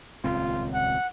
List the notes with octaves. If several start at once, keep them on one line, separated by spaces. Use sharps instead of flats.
D#1 C#2 C4 F4
F#5